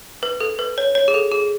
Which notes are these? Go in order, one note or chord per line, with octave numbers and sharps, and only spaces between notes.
B4
A4
B4
C#5
C#5
G#4
A4
G#4